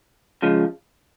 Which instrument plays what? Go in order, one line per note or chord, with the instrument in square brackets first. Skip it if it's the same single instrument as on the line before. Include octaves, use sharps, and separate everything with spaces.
[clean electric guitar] C#3 F3 G#3